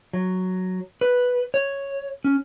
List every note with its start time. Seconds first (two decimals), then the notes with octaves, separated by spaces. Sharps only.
0.13 F#3
1.01 B4
1.54 C#5
2.24 C#4